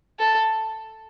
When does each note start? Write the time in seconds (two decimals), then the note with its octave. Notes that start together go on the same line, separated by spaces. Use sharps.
0.19 A4